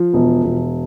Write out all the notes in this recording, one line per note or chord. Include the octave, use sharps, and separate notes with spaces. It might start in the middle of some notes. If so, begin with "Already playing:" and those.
Already playing: F3
E1
E1